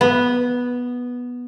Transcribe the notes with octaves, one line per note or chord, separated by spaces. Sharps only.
B3